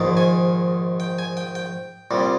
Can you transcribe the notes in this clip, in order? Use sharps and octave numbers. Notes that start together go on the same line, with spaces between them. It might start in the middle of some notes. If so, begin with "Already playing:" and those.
Already playing: A#1 G#2 D#3
G#5
G5
G#5
G5
G5
C2 A#2 G3